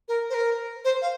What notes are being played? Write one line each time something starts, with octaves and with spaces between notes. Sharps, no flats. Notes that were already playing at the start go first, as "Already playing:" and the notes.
A#4
C5
A#4
C5
F5